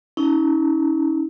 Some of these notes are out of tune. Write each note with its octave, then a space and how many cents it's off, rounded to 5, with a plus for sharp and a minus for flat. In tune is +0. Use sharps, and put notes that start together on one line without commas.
C#4 +30 E4 -40